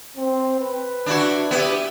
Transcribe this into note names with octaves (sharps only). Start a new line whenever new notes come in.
C4
B4
D4 E4 F#4
B3 E4 G4